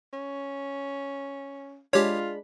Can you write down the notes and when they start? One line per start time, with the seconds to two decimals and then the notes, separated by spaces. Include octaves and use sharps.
0.13 C#4
1.93 G#3 D4 F4 G4 C#5 B5